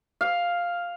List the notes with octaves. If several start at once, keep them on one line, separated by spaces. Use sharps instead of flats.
F5